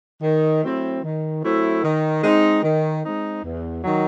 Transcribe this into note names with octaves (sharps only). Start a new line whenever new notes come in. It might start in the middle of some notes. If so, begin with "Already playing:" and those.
D#3
F#3 A3 C4 E4
D#3
F#3 A3 C4 E4
D#3
G#3 C4 D#4
D#3
G#3 C4 D#4
E2
D#3 F#3